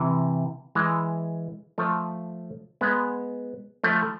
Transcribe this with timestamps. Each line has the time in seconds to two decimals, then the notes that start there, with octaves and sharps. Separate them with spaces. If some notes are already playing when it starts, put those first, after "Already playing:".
Already playing: C3 E3
0.75 E3 G#3
1.78 F3 A3
2.81 G#3 B3
3.84 F3 A3